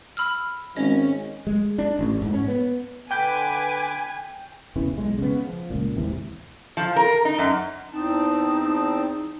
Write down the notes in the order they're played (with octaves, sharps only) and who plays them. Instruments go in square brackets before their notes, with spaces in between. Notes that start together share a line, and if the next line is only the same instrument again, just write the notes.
[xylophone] B5 E6 F6
[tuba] G#1 [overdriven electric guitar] C#4 [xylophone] D#5
[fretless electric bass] G#3
D4
A1
G#2
C#4
B3
[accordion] D3 B4 D6 [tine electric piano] G5 G6 [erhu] G#5
[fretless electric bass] E2 C#3 E3
B1 G#3
C#3 B3
F3
C#2 A#2
G#1 D#2 C3 E3
[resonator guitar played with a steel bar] F3
A#4
D#4
F#2
[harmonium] E2 C4 A5 [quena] D#4